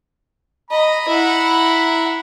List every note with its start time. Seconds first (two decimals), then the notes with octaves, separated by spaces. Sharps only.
0.71 D#5 A#5 B5
1.08 E4 F#5